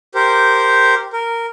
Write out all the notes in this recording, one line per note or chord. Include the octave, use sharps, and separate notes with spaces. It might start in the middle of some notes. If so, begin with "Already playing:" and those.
G4 A#4 C5
A#4